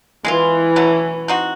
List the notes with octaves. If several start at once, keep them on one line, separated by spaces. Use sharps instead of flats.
E3 G#3 C4 F4
B2 F#3 A3 C#4
C4 D#4 F#4